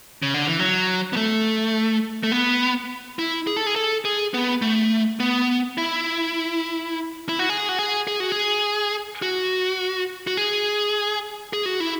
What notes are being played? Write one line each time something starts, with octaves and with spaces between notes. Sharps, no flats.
C#3
D3
E3
F#3
B3
A3
A3
B3
E4
G#4
A4
G#4
A4
G#4
B3
A3
B3
E4
E4
F#4
G#4
F#4
G#4
G#4
F#4
G#4
F#4
F#4
G#4
G#4
F#4
E4